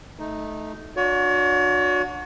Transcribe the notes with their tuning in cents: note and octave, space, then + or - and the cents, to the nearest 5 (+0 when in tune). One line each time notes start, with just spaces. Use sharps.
A3 -15 D#4 +0
D4 +20 F#4 -30 C#5 +40